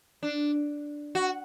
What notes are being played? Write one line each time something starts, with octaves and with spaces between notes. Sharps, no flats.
D4
F#4